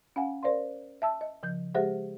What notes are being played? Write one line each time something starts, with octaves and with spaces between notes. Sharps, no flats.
C#4 F5 F#5 G#5
A#4 C5 D5 F5 C6
E5 A5 E6
D#5
C#3 F3 G6
G#3 G4 G#4 C5 E5 F#5